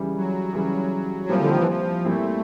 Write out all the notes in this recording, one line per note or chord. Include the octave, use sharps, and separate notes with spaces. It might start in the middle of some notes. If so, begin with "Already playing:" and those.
Already playing: C#3 E3 G3
F#3
C#3 E3 G3
A#2 F3 G3 C4 E4
D3
D#3
E3
F3
A#2 G3 A3 C4 E4